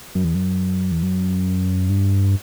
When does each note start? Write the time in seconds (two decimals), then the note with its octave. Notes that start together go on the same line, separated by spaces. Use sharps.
0.15 F#2
0.24 E2
0.35 F#2
0.92 E2
1.03 F#2
1.90 G2